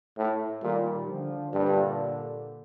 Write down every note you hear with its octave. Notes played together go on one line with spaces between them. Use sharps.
A2
A#2 D#3 G3
D3 F3
G2 A#2 D3